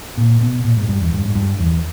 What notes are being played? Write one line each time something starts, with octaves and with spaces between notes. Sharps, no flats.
A#2
B2
A#2
G#2
G2
E2
G2
G#2
G2
E2